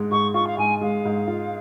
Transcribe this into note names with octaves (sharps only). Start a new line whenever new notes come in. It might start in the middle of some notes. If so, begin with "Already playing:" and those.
Already playing: G#2 G#3
G#2 C#6
F4 C#6
F5
G#2 G#5
G#3 F5
G#2
F4